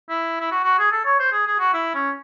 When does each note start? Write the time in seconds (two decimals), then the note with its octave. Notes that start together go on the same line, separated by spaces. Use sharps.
0.09 E4
0.40 E4
0.51 F#4
0.64 F#4
0.78 G#4
0.92 A4
1.05 C#5
1.19 C5
1.32 G#4
1.47 G#4
1.59 F#4
1.73 E4
1.94 C#4